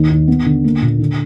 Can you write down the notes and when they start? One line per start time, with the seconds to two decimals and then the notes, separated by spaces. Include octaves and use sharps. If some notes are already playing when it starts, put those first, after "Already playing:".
Already playing: D#2 D#3
0.10 D#2
0.28 B3
0.46 D3
0.64 A#3
0.82 A#2
1.00 D3